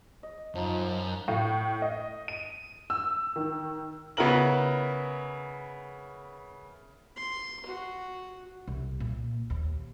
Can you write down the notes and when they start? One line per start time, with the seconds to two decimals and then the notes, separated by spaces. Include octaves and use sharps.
0.23 D#5
0.55 F#2 F3 D#4
1.28 A2
1.82 D#5
2.28 D#7
2.90 E6
3.36 D#3
4.17 C#3 B3 E4 A#4 A#5 F#7
7.16 C6
7.66 F#4
8.68 C2
9.00 A#2
9.50 D#2